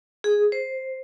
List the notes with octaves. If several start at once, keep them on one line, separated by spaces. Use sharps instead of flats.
G#4
C5